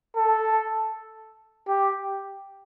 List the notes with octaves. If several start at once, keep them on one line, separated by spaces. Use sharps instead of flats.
A4
G4